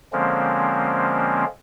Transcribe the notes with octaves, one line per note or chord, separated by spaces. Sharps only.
D3 F3 G#3 A#3 C4 C#4